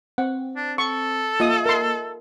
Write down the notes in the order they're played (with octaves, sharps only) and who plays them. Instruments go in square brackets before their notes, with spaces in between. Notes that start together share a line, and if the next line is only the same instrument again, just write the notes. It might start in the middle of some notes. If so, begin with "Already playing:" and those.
[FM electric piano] C4 [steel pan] F#5
[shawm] D4
[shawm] A4 [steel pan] C#6
[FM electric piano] A#3 D#5 E5 [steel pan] F4 D#6
[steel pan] A#4 C6